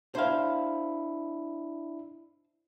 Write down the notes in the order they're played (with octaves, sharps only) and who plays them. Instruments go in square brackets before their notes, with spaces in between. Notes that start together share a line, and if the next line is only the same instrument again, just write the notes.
[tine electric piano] D4 E4 [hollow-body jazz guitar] C5 F5